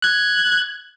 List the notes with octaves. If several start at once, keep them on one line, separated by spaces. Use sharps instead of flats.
F#6 G#6